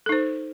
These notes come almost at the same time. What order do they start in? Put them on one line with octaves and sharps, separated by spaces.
A4 D#4 C5